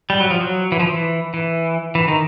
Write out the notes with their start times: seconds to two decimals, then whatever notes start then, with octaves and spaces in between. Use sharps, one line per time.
0.10 G3
0.20 F#3
0.31 F3
0.41 F#3
0.72 E3
0.79 F3
0.87 E3
1.34 E3
1.95 E3
2.08 D#3